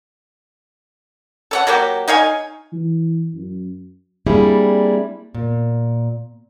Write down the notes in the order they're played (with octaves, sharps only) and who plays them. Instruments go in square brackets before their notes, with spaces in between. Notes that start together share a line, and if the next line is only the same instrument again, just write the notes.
[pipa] A4 C#5 F#5
F#3 A#3 F#4 G4
D#4 C#5 F5 G#5
[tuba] E3
F#2
[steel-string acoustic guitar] G3 A#3 C4 D4 E4 G#4
A#2